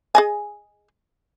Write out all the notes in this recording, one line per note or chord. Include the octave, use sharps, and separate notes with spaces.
G#4 D#5 G#5